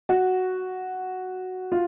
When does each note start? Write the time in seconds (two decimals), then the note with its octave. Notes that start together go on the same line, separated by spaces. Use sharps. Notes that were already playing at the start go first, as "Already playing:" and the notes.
0.09 F#4
1.72 F4